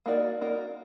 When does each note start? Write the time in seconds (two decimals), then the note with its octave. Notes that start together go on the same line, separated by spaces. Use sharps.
0.06 A#3 D#4 F#4 A#4 D5
0.41 A#3 D#4 F#4 A#4 D5